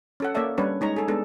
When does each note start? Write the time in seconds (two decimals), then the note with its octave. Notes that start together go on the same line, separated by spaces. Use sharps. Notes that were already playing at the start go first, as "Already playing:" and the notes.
0.20 C#4 A4 F#5
0.35 A#3 A4 C#5 D5 E5 A5
0.58 G3 C#4 D4 B4 C#5
0.81 G#3 D#4 C#5 A#5
0.96 G#4 A4
1.08 G#3 B3 D4 A4